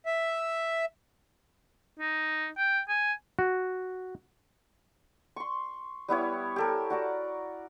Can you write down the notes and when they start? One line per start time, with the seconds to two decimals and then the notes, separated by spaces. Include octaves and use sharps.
0.06 E5
2.00 D#4
2.58 G5
2.89 G#5
3.39 F#4
5.36 C6 C#6
6.08 G3 B3 E4 C#5
6.56 G4 A4 A#4
6.90 F#4 D5 A#5